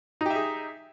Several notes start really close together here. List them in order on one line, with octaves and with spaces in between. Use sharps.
D#4 G4 E5 G#4